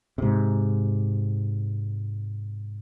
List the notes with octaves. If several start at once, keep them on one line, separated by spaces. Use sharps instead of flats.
G#2 C3